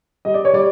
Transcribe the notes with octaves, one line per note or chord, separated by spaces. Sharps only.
G3 D#5
D5
C#5
G3 D5